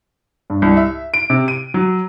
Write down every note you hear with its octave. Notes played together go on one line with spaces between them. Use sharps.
G2
C2
E5
D7
C3
D#7
F#3